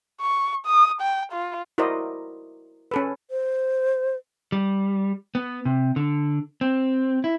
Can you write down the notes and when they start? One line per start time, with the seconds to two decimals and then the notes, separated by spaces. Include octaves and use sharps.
0.21 C#6
0.66 D#6
1.01 G5
1.32 F4
1.78 E4 F#4 A#4 C5 D5 D#5
2.91 C#4 A4 B4
3.31 C5
4.52 G3
5.35 B3
5.65 C3
5.96 D3
6.61 C4
7.24 E4